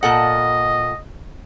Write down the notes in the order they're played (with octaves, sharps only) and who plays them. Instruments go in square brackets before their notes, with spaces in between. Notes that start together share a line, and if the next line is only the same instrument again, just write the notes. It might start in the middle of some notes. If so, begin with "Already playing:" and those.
[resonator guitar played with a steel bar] A#2 A4 F#5 [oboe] D#5